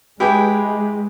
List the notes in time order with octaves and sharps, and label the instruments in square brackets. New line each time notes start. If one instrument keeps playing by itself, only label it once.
[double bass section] G#3 [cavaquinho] E4 B4 G5 [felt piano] G4 G#4